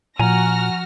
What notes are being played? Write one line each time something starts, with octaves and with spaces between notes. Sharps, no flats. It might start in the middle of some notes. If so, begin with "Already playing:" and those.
A#2 F3 F#4 G#5 A#5 F6 A#6